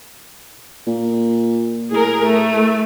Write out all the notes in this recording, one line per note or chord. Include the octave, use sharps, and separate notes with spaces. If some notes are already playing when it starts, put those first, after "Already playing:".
A#2
A2 G#4 A#4
A3